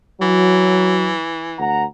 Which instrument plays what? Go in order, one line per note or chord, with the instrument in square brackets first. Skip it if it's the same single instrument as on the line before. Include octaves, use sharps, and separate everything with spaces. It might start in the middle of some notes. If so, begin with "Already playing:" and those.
[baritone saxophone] E3 [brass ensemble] F#3
[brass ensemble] D2 F#5 A#5